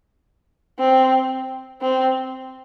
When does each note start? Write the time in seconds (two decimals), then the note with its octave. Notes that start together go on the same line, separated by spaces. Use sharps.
0.79 C4
1.82 C4